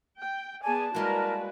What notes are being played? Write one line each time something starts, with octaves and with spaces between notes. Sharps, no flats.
G5
B3 G#4 D5 G#5 A5
G3 G#3 A#3 E4 F#4 A#4 B4